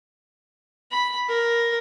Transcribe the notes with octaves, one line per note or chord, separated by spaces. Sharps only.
B5
A#4